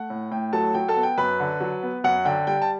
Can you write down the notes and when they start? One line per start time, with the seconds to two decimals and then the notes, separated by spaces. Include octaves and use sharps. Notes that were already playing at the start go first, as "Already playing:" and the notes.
Already playing: A3 F#5
0.10 A2
0.31 A2 G5
0.53 F#3 A4 A5
0.74 F#3 G5
0.88 A4 A5
0.96 B3
1.03 G5
1.18 F#2 B4 B5
1.40 D3
1.61 F#3
1.83 B3
2.04 F#2 F#5
2.25 D3 G5
2.47 G3 G5
2.62 A5